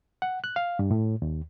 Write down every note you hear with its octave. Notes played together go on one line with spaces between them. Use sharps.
F#5
F#6
F5
G2
A2
D#2